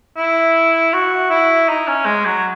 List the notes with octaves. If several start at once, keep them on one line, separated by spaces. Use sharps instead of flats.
E4
F#4
E4
D#4
C#4
G#3
F#3